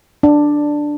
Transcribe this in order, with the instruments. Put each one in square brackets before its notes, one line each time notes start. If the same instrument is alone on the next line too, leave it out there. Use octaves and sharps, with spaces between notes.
[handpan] D4